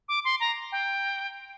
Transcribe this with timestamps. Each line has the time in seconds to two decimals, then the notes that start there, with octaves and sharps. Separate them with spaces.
0.09 D6
0.25 C6
0.40 A#5
0.72 G5